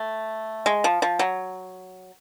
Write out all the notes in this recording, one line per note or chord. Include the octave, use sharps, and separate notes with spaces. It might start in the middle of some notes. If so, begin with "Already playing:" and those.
Already playing: A3
G#3
F3
F3
F#3